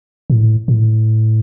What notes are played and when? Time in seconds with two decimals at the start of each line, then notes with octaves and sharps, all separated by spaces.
0.30 A2
0.68 A2